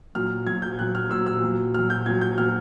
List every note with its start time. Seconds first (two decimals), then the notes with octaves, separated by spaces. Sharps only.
0.15 A#2 F#3 F6
0.47 A#2 F#3 G#6
0.62 G6
0.79 A#2 F#3 F#6
0.95 F6
1.10 A#2 F#3 E6
1.26 E6
1.41 A#2 F#3
1.74 A#2 F6
1.78 F#3
1.90 G6
2.06 A#2 G#6
2.09 F#3
2.21 G6
2.37 A#2 F#3 F6